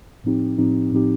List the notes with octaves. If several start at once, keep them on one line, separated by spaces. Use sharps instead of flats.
A2 F3 C4 D#4 G4
A2 F3 C4 D#4 G4
A2 F3 C4 D#4 G4